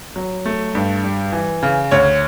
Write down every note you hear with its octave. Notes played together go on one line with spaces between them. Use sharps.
F#3
A3
G2
G3
E3
C#3
D2 C#5